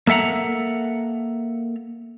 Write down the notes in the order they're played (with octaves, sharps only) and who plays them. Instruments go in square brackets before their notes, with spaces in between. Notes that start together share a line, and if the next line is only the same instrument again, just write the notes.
[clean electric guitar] A#3 A4 E5 F#5 A#5